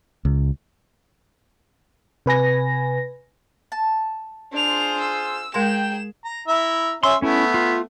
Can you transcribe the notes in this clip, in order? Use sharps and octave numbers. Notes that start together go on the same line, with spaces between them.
C#2
C3 B4 G#5 A#6
A5
D4 F4 G#4 C5 F7
E6
G#3 G#4 A#4 G5 A#5 C6 E7
A#5
E4 E5 A#5
C#4 E5 C6
A3 B3 C#4 E4
F4